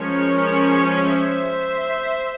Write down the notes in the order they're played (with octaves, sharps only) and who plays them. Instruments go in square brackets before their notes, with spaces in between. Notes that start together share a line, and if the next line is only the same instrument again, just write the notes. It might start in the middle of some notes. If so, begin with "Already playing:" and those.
Already playing: [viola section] F3 G#3 C#4 A#4 C#5
C5 E5